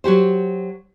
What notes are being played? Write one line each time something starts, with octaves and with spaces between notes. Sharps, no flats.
F#3 F#4 G4 C5